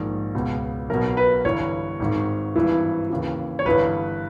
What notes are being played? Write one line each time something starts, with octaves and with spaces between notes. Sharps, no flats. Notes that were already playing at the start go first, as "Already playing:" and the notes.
Already playing: A#1 G#2 D#3
C#2 B2
B1 B2 A#4
B4
G1 G2 E3 C#5
G#1 G#2 D#3
G#1 G2 E3
D#2 C#3 E3
C#5
G1 G2 E3 B4